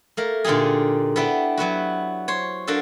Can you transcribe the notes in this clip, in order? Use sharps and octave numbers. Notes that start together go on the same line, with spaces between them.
A3 A#3 A#4
A#2 D3 D#4 G4 G#4
B3 D4 E4 G4
F#3 B3 E4 F#4
C5 C#5
A#3 D4 F#4 A4